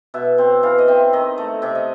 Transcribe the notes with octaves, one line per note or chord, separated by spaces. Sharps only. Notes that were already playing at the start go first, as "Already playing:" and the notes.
B2 E5
C4
E3 F5
D#5
C4 E5
D#3 D#5
A3
C3 E5
D#5